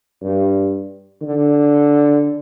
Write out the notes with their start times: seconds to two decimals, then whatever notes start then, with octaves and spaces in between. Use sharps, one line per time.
0.22 G2
1.22 D3